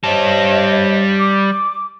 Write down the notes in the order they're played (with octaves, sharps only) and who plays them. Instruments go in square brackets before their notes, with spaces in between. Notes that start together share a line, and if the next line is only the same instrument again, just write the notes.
[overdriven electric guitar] G3 A5 [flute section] C5 C#5 D#5
[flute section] D6